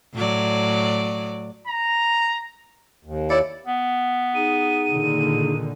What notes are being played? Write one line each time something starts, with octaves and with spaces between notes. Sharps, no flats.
A2 F#3 D5
A#5
D#2
E4 C#5 D5
B3
D#4 G#4 D#7
A#2 D3 D#3